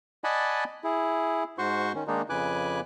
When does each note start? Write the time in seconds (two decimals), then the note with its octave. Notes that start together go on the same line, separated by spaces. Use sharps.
0.24 D5 D#5 F#5 G#5 A5 B5
0.84 E4 G#4
1.58 G#2 F#4 C5 C6 C#6
1.95 D#3 C#4
2.07 D#3 G#3 A#3 D4 D#4
2.30 F2 C#3 B4 G#5 D6 F#6